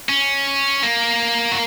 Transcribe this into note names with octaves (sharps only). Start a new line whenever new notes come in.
C#4
A#3
F#4